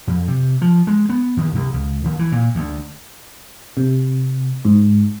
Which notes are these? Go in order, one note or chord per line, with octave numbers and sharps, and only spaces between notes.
F2
C3
F3
G#3
B3
D#2
C2
C#2
D#2
E3
A#2
D2
C3
G#2